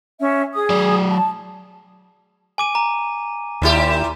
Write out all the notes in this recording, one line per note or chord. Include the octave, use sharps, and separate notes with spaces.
C#4 E5
G#4 D#6
F#3 D5
A5
G#5 D6 D#7
A#5
D#2 A#2 E4 G4